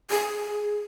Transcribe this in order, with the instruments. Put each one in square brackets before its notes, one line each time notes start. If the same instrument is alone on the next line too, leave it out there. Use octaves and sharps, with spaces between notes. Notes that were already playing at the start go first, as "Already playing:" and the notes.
[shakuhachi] G#4